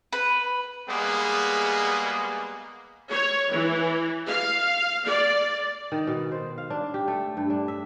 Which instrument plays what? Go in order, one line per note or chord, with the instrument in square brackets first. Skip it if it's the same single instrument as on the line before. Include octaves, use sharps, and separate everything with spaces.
[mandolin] B4
[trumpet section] G3 G#3 A#3 B3 G#4
[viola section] C#5
E3
F5
D5
[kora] D#3
B2
C5
F5
D4
G4
A3
G2
D4
E5